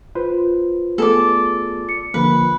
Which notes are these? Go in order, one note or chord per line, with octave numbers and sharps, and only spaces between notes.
F4 B4 C5
A3 B3 G#4 A4 D5
C#7
D3 F3 A#3 B4